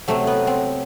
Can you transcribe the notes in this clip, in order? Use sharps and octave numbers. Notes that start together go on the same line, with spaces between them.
C3 F#3 A3
B3
C4